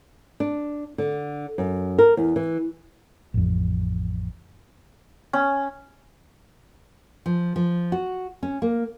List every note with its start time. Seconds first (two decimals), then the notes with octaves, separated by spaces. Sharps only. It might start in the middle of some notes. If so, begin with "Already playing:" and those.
0.40 D4
0.98 D3
1.58 F#2
1.99 A#4
2.17 E2
2.36 E3
3.34 A1 F2
5.33 C#4
7.26 F3
7.56 F3
7.92 F#4
8.43 C#4
8.62 A#3